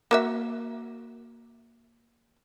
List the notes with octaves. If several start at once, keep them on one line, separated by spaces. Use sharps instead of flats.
A#3 F#4 E5